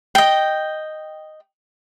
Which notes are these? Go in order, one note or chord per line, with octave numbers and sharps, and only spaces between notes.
D#5 G5